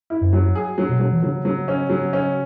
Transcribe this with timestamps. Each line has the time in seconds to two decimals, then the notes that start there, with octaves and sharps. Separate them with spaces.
0.10 E4
0.21 F#2
0.33 F#3
0.55 G#4
0.78 F#3
0.89 B2
1.00 F#3
1.12 E3
1.23 C#3 F#3
1.45 F#3
1.68 C#4
1.90 F#3
2.13 C#4